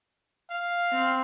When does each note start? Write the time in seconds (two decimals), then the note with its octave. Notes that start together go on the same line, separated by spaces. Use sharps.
0.51 F5
0.92 C4